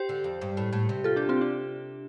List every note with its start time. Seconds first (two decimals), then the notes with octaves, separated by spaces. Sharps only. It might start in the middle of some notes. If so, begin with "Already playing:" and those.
Already playing: G4 C5
0.09 D3
0.24 F2
0.41 G2
0.57 A2
0.73 A2
0.89 C3
1.04 F4 A4
1.16 D4 G4
1.29 C4 F4
1.41 D4